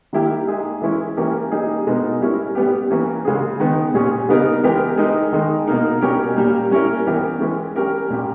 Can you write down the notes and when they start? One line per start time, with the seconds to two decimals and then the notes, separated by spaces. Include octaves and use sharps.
0.13 D#3 G3 A#3 E4 G4
0.47 G#3 D#4 G#4
0.82 E3 G#3 C#4 E4
1.17 E3 A#3 C#4 G4 A#4
1.52 G3 A#3 D#4 G#4
1.87 B2 G#3 B3 D#4 A#4
2.21 G3 C#4 E4 A#4
2.55 G3 B3 G4
2.90 E3 A#3 C#4
3.25 C#3 G#3 C#4 G#4
3.60 D#3 G#3 B3
3.94 A#2 G3 C#4 G#4
4.29 C#3 G3 B3 D#4 A#4
4.64 E3 G#3 B3 G4 A#4
4.97 G#3 D#4 A#4
5.32 D#3 G#3 D#4
5.67 B2 A#3 D#4 A#4
6.01 B2 G3 C#4 G4 A#4
6.37 A#2 G3 A#3
6.71 G3 C#4 E4 A#4
7.06 E3 G3 B3 G4 A#4
7.40 E3 G#3 C#4
7.76 G3 C#4 G4 A#4
8.10 A#2 G3 A#3 C#4 G4